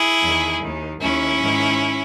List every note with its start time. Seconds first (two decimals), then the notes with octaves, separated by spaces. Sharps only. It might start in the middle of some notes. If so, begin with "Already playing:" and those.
Already playing: E4 G#4
0.23 E2 D#3
0.63 D#2 D#3
1.02 D#2 D#3 C#4 E4
1.42 G#2 D#3